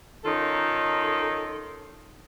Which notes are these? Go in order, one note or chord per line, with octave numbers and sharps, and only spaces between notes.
D#3 C#4 D#4 F4 A4